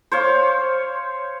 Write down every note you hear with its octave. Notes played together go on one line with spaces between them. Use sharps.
C5 C#5 F5